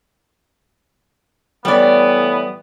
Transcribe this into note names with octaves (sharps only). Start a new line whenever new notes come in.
A2 E3 G3 B3 D5